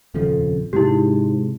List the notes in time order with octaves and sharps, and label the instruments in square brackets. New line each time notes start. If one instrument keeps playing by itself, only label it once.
[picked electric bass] D#1 C#3 F3 [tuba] F2
[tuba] G#2 [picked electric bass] C3 G#3 [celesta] E4 G4